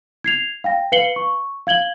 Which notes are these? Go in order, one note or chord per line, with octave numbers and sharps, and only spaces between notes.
G#6 C7 F7
F5 G5 A#6
B4 F5 C7 C#7 F#7 G7
C#6
F5 G#6 F#7 G7